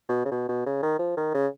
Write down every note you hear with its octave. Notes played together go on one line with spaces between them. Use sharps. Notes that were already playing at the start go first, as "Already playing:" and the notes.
B2
C#3
B2
B2
C#3
D#3
F3
D#3
C#3